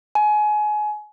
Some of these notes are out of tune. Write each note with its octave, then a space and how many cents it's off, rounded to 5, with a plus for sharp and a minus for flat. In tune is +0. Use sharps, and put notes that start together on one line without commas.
G#5 +25